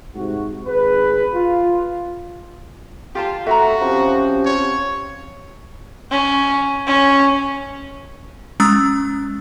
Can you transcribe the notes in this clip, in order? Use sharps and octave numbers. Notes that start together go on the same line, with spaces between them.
G#2 C3 F#4
G#1 G#4 B4
F4
F4 G4 A5
A3 F#4 E5 A#5
F3 C4 C#4 G4
C#5
C#4
C#4
G#3 C#4 A#5 D#6 E6 A6